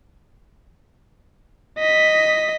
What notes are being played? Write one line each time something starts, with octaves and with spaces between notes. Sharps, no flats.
D#5 B6